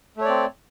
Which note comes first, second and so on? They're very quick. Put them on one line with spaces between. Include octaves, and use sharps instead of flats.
A3 C#5 D5 C4